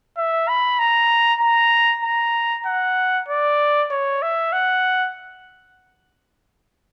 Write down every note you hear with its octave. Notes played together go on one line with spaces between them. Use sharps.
E5
B5
A#5
A#5
A#5
F#5
D5
C#5
E5
F#5